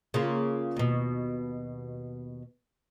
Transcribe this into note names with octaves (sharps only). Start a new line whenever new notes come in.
C#3 A#3 F4
D#2 B2